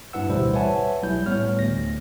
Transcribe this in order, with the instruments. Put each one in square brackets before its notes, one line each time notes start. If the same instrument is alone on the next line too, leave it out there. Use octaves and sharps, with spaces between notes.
[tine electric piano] G2 D4 E4 B4 F#5 E6
A1 D2 B2 G3 E4 C5
B4 C#5 E5 F#5 G#5 A5
B1 F#3 G3 E4 G6
A2 G3 B3 C#5 F6
D2 A#6